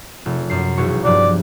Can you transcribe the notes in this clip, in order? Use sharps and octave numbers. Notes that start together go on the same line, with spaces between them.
F1
F#2 C7
E1 B1 C#6
G2 F3 F#3 D5